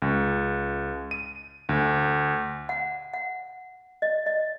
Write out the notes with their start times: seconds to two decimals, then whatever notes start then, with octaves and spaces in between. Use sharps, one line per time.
0.02 C#2
1.11 D#7
1.69 D2
2.69 F#5
3.13 F#5
4.02 D#5
4.26 D#5